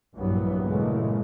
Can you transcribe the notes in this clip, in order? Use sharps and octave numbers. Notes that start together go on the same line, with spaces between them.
A#1 G2 E3 F#3 B3
A#2 C#3 E3 G#3 A3